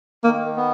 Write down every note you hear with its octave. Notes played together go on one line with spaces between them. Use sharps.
D#3 A#3
B3